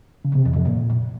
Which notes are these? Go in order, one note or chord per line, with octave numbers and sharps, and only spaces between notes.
C#3
C3
E2
F2
A#2